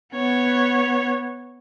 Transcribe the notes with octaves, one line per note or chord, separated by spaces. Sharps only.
B3 C#5